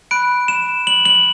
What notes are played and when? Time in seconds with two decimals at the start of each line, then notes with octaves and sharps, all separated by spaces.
0.11 B5 F#6 D7
0.48 E7
0.87 F#7
1.05 F#7